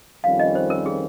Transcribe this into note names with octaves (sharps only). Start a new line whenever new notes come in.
F2 D#3 G3 C#4 F4 F5
D#5
C5
A#4
G#4